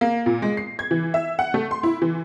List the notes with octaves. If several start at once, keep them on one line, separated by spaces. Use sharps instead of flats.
A#3
A#2
G#3
C7
G#6
E3
E5
F#5
A3
C6
E4
E3